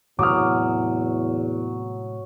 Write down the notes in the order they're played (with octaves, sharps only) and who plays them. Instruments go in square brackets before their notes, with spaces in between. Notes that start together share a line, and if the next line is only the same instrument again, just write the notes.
[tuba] E2 [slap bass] A2 C3 G#3 [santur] F#3 [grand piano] D6 D#6 F6